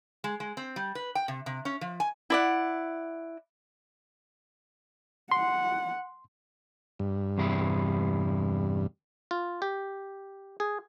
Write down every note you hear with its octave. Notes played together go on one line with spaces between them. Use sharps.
G#3
G#3
C4
G3
B4
G5
C3
C3
C#4
F3
G#5
E4 D5 F#5
F#5 C6
G2
E2 C3 E4
F4
G4
G#4